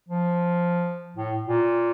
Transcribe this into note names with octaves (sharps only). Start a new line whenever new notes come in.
F3
A2
A#2